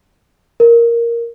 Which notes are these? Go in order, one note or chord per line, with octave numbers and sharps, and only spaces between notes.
A#4